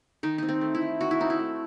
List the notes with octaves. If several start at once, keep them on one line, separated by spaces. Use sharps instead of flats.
D#3 D#4
C4 D#4
C4
A3
E4
D#3
D#3 F#4
E4
C4 D#4
E4
A3